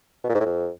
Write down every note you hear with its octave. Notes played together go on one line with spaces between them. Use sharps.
B2
A#2
G#2
A2
F2